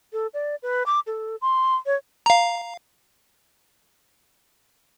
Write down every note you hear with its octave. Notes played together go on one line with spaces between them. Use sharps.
A4
D5
B4
D6
A4
C6
C#5
F5 A#5